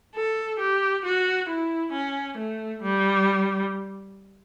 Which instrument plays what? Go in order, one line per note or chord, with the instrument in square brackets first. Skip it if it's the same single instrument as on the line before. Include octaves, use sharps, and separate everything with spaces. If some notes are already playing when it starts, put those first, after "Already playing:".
[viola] A4
G4
F#4
E4
C#4
A3
G3